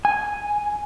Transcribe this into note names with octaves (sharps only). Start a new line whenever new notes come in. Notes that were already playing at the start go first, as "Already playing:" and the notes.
G#5